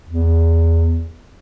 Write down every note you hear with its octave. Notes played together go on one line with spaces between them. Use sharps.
E2